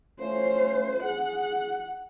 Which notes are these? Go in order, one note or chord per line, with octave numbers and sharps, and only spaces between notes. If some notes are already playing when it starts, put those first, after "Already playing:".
A3 C#4 F4 C5
G#4 F#5